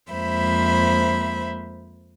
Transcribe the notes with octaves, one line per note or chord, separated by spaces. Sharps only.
F2 G#3 A#3 C5 E5 B5